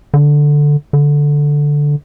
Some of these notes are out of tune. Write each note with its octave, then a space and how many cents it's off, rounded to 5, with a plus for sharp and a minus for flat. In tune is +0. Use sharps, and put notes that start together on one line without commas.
D3 +0
D3 -5